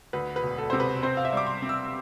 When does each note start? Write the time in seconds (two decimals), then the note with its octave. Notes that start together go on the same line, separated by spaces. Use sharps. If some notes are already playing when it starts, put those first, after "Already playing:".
0.13 D2 B4
0.36 B4
0.43 E1
0.58 A4
0.70 C3 C5
0.80 B4
1.03 C4 C5
1.17 F5
1.25 E5
1.33 G3 D6
1.47 C6
1.62 C4
1.69 E6